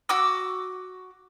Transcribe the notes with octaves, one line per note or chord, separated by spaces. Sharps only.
F#4 D6 E6